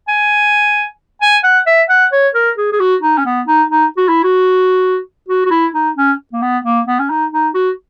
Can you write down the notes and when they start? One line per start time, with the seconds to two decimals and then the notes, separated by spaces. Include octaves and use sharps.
0.08 G#5
1.22 G#5
1.44 F#5
1.67 E5
1.90 F#5
2.12 C#5
2.35 A#4
2.58 G#4
2.73 G#4
2.80 F#4
3.02 D#4
3.18 C#4
3.26 B3
3.47 D#4
3.70 D#4
3.97 F#4
4.09 E4
4.24 F#4
5.29 F#4
5.46 F#4
5.51 E4
5.74 D#4
5.97 C#4
6.33 A#3
6.42 B3
6.65 A#3
6.87 B3
7.00 C#4
7.10 D#4
7.33 D#4
7.54 F#4